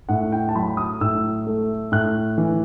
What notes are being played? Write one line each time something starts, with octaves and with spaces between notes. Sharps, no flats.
A2 F#5
G5
A5
F#3 B5
D#6
A2 E6
A3
A2 F#6
E3